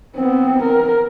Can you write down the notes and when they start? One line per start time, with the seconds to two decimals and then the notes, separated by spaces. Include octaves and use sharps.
0.16 B3 C4
0.63 A#4